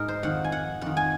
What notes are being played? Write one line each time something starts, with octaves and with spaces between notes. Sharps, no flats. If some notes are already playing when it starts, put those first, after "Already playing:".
Already playing: G#2 D#4 A#4
C5
F2 D#3 F#5
G#5
F#5
F2 D#3 F#5
G#5